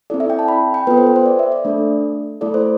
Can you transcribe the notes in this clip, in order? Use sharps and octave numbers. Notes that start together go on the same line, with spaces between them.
C4 E4 A4 D5
E5
G5
A5
B5
G5
B3 F4 A4 B4
C5
B4
C5
D5
E5
D5
A3 D4 A4
A3 E4 A4 D5
C5